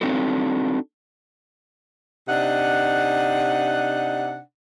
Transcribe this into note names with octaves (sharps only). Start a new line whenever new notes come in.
C4 D4 D#4 F#4 A4
C3 D4 D#4 F#5